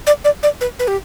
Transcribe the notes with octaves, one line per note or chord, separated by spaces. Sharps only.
D5
D5
D5
B4
B4
G4